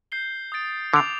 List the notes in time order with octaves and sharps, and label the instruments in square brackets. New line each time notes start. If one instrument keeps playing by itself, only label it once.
[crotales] G6 C7 G7
D#6 A6 D7
[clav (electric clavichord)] D3 [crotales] D6 A6 D7 F7